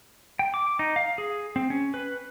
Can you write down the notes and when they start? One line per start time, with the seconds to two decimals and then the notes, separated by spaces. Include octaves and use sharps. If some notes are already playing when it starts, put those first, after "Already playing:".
0.39 G5
0.54 D6
0.79 D#4
0.96 F5
1.18 G#4
1.56 C4
1.70 C#4
1.94 B4